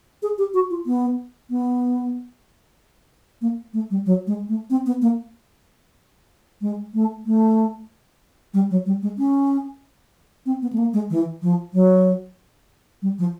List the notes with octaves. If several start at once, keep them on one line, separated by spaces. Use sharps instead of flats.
G#4
G4
F#4
F4
B3
B3
A#3
A3
G3
F#3
G#3
A3
C4
B3
A#3
G#3
A3
A3
G3
F#3
G3
G#3
C#4
C4
B3
A3
A#3
G#3
E3
F3
F#3
G3
F3